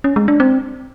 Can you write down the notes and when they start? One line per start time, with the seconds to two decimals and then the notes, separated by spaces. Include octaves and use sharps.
0.04 C#4
0.16 G#3
0.28 D4
0.40 C4